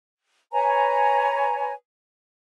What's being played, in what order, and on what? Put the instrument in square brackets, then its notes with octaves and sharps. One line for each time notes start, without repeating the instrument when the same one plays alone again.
[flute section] B4 C#5 G#5 A#5